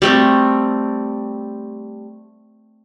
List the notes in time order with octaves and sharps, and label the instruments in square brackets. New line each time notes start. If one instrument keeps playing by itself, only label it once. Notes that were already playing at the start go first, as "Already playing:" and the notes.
[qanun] G3 A3 C4